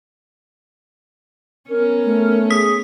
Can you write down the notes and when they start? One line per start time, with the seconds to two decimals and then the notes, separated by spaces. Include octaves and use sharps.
1.70 B3 C#4 A#4
2.05 A3
2.50 G#4 D#6 B6